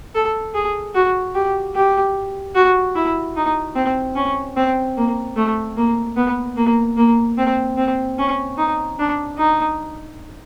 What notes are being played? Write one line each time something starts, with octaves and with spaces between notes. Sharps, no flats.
A4
G#4
F#4
G4
G4
F#4
E4
D#4
C4
C#4
C4
A#3
A3
A#3
B3
A#3
A#3
C4
C4
C#4
D#4
D4
D#4